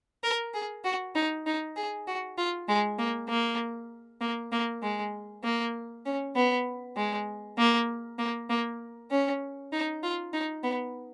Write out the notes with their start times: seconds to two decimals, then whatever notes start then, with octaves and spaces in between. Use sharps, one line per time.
0.24 A#4
0.54 G#4
0.85 F#4
1.15 D#4
1.47 D#4
1.76 G#4
2.08 F#4
2.38 F4
2.69 G#3
2.99 A#3
3.29 A#3
4.21 A#3
4.52 A#3
4.83 G#3
5.44 A#3
6.06 C#4
6.36 B3
6.97 G#3
7.58 A#3
8.19 A#3
8.50 A#3
9.11 C#4
9.73 D#4
10.03 F4
10.34 D#4
10.64 B3